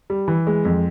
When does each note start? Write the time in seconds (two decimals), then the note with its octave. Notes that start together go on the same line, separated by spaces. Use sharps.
0.10 G3
0.28 E3
0.47 G#3
0.65 F2